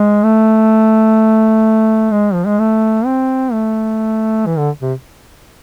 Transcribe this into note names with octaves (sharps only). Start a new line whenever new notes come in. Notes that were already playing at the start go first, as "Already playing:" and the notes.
Already playing: G#3
A3
G#3
F3
G#3
A3
C4
A3
E3
D3
C3